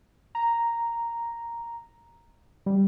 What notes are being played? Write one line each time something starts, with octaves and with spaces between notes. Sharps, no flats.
A#5
G3